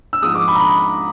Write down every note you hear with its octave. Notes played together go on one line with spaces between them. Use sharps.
E6
G#2 F3 G#3 D#6
D6
B5
A#5
B5